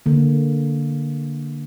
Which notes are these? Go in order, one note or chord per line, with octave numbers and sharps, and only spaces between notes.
D3 A#3